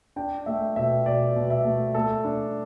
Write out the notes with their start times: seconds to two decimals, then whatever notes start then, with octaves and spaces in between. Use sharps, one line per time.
0.16 D4 G5
0.46 A3 E5
0.76 B2 E5
1.06 B2 D5
1.36 B2
1.50 E5
1.65 A3
1.94 A3 A4
2.25 D4